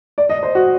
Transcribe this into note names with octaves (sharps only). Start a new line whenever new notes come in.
D5
D#5
C5
F#4